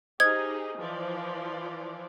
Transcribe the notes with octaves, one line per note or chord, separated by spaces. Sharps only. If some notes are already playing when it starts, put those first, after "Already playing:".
D#4 G4 G#4 C5 D#5 D#6 G#6
E3 F3 D5